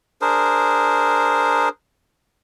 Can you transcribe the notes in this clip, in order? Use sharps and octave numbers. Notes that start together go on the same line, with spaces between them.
D4 G#4 A#4 C5